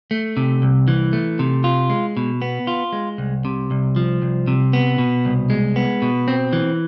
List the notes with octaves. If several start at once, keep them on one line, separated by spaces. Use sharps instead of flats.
A3
C3
C2
E3
A3
C3
F4
G#3
B2
B3
F4
G#3
C2
C3
C2
F3
C2
C3
B3
B2
C2
G#3
B3
B2
C4
E3